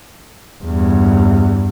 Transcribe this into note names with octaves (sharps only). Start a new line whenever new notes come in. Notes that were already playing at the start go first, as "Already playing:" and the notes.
E2 G2